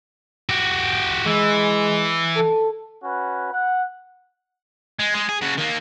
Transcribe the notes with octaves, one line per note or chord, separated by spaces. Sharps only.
F#4 G4
E3 G#3
A4
C#4 F#4 B4
F#5
G#3
G#3
G#4
C#3 F#4
D#3 A#3